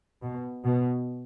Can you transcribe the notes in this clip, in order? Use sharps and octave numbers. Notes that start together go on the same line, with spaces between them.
B2
B2